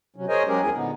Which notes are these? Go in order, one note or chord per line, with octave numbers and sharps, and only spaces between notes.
C3 F#3 C#4
G#4 A#4 C5 C#5 D#5 G#5
F#3 G#3 C#4 G4 G#4 A#4
E2 F3 E4 G#4 A#4 G#5
A#2 D3 B3 D#4